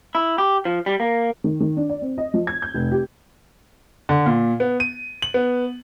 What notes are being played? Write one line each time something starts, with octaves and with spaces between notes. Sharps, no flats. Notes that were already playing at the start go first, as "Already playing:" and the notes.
E4
G4
F3
G3
A#3
D#3
D#3
D4
D5
C4
D#5
F3
G#6
G6
F1
G4
D3
A#2
B3
D#7
F#7
B3